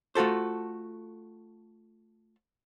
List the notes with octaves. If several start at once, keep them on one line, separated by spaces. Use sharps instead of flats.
A3 F4 F#4 A4 C5